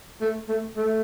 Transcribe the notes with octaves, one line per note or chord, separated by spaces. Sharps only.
A3
A3
A3